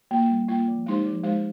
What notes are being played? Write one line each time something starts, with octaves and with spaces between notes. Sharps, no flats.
A#3 F4
G3
A#3 F4
F3
G#3 D#4 G4 C5
F3
G#3 D#4 G4 C5